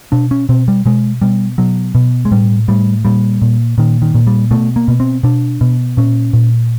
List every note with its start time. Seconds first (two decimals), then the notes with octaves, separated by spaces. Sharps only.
0.12 B2 D4
0.31 C#4
0.49 B2 C4
0.68 G3
0.86 B2 G#3
1.22 B2 G3
1.58 B2 F#3
1.95 B2
2.25 G#3
2.31 A2 G3
2.68 A2 G3
3.05 A#2 G3
3.42 A#2
3.78 A#2 D#3
4.02 D#3
4.15 A#2
4.27 G3
4.51 B2 A3
4.76 A#3
4.88 B2
5.00 C4
5.23 B2 D4
5.61 B2
5.97 A#2 C#4
6.33 A#2